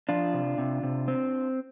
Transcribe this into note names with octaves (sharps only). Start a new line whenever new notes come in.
F3 D4 F4
C3
C3
C3
C4